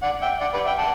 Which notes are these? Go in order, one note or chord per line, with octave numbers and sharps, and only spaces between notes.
D5 F#5
E5 G5
D5 F#5
B4 D5
E5 G5
F#5 A5